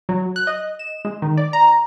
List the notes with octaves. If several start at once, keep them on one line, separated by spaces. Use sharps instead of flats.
F#3
F#6
D#5
E7
G#3
D#3
D5
A#5